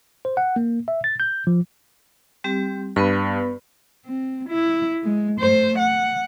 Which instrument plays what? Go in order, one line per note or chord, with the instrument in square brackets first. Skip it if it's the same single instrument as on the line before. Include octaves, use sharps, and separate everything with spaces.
[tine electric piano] C5
F#5
A#3
E5
A6
G6
F3
[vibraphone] G3 C4 G4
[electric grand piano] G2 [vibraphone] B3 B4 B5
[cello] C4
E4
G#3
A3 C5
F#5